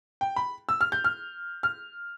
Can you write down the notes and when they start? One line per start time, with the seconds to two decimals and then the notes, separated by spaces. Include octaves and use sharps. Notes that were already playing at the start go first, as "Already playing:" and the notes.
0.21 G5
0.36 B5
0.69 E6
0.81 F6
0.92 G6
1.04 F6
1.63 F6